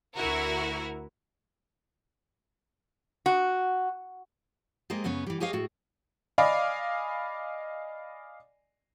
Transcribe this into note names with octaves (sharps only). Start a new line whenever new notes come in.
D2 E4 F#4 A#4
F#4
G3 G#3 A#3 C5 D#5
F#2 C#3 B3 C#4 C#5
E3 G3
G4 G#4 C#5 D#5 F5
A2 F#4
D5 D#5 F5 G#5 B5 D6